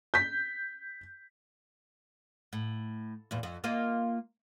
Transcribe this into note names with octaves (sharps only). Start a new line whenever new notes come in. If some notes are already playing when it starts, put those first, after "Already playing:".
G6 B6
A2
E2 A#2
F2
A#3 F4 D#5